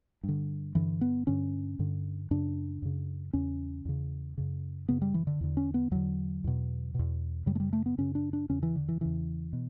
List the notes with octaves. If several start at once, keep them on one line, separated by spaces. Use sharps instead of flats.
G2 D3
G2 D3 E3
B3
G2 D3 C#4
G2 D3
F#2 C#3 D4
F#2 C#3
E2 C#3 C#4
E2 C#3
F#2 C#3
F#2 C#3 B3
G3
E3
D3
E2 D3
C#4
B3
E2 D3 F#3
E2 B2
E2 B2
F#2 C#3 G3
A3
G3
A3
B3
F#2 C#3 C#4
D4
D4
E2 C#3 C#4
E3
D3
E3
E2 C#3 E3
B2